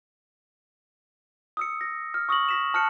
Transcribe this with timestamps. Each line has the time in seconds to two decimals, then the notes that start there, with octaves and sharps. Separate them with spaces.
1.57 D#6 E6 C#7
1.81 A#6
2.14 F6
2.29 C#6 D#6 A#6 F#7
2.49 A#6 B6 E7
2.74 A5 F6 F#6 C#7